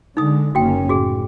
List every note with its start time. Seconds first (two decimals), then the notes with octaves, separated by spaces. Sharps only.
0.17 D3 G#3 D#4 D#6
0.55 F#1 A#3 C#4 F#4 G5
0.89 A2 F#4 G#4